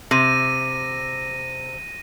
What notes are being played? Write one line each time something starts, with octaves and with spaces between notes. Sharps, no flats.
C3 A#6 D#7